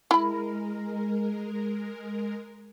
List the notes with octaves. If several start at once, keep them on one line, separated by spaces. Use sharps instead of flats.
G#3 E4 A#4 B5